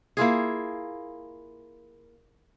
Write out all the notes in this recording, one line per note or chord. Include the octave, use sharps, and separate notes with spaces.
A#3 E4 F4 G#4